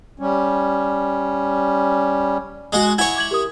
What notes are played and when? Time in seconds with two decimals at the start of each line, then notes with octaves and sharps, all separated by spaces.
0.19 G3 C#4
2.73 G#3 F#4
2.98 E4 C#5 F#5 G#5 G#6
3.16 D6 G#6 F#7
3.31 G4 A#4 D#6